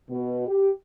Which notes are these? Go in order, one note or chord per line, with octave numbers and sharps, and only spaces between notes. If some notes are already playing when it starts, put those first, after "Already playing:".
B2
G4